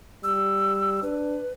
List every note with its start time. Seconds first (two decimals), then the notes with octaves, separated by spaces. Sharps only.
0.24 G3 E6
1.03 D4 B4